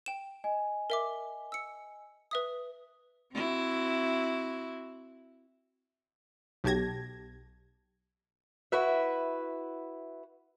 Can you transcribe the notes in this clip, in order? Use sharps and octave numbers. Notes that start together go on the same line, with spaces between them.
G5 E7
D#5 G#5
A#4 E5 D6
E6 C#7
B4 E5 D#6
C4 E4 F#4
B1 G4 A5 G#6 A#6
E4 F#4 B4 E5